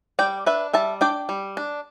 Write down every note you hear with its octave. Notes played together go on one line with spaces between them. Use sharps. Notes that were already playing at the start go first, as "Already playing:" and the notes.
G3 D5 G5
D4 B4 E5
G3 E5 A5
D4 D5 G5
G3
D4